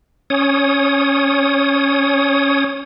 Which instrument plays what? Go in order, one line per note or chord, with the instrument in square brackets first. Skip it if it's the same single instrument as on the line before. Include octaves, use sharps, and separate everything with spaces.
[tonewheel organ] C#4 C#5 D#6